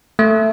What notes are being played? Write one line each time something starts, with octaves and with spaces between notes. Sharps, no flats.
A3